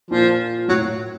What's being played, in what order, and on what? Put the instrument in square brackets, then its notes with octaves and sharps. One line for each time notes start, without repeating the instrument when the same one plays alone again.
[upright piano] A#2 [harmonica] F3
[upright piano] A2 [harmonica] F#3